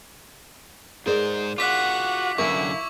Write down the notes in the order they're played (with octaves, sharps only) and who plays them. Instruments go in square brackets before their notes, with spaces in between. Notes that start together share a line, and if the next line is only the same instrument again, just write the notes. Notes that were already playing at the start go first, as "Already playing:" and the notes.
[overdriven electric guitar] G#2 C5 [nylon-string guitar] G#4 A#4 D5
[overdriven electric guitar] F4 F#4 [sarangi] F#5 [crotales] D6 B6
[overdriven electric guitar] F#2 D3 [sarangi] E4 [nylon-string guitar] A#4 F5 G#5 [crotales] C#6